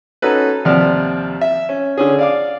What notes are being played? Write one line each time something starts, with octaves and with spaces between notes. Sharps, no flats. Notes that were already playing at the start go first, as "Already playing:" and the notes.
C#4 D#4 F#4 A4 B4
D#2 C3 F3 D5 F#5 F6
E5
C#4
D3 C#4 G#4
D5 F5 D6